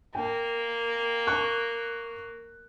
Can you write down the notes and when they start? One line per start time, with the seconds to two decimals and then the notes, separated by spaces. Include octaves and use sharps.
0.15 A#3 G5
1.27 C#6 F#6